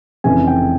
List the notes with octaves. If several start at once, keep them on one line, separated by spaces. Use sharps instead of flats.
F1 F2 C#3 E3 G#5
G5